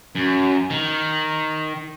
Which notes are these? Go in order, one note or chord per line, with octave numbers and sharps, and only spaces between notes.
F#2
D#3